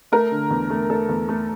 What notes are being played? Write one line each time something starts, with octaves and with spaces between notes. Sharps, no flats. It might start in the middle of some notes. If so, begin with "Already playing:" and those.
A3 A#4
D3
E2
A3
A3 A4
E2
A3